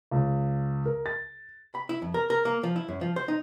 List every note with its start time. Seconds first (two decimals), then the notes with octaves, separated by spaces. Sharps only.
0.11 C#2
0.86 A#4
1.06 A6
1.75 B5
1.89 E4
2.02 F2
2.14 A#4
2.30 A#4
2.45 A#3
2.63 F3
2.76 E4
2.88 F#2
3.01 F3
3.16 C5
3.28 D#4